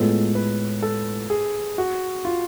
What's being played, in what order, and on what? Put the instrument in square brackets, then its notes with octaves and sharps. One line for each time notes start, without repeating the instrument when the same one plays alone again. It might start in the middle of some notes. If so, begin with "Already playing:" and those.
Already playing: [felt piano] A2 G#3 B3 F4 [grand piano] A4
[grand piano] B4
A4
G#4
F#4
F4